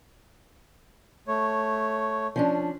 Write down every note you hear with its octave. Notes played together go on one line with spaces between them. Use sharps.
A3 C#5
F3 C#4 D4